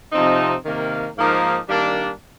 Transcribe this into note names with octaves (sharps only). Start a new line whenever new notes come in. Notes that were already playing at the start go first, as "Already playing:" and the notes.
C3 F3 C4 D#4
C3 D#3 A#3
G#2 F3 A#3 D#4
D#3 G3 A#3 D4